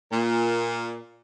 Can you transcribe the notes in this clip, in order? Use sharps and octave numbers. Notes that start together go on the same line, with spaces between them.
A#2